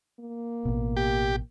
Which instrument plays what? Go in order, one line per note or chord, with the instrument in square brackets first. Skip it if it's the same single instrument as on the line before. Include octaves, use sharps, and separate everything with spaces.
[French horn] A#3
[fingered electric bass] A1 B2
[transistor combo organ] G4